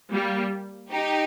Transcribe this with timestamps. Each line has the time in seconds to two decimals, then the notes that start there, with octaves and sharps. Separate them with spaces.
0.12 G3 A#3
0.91 D#4 G4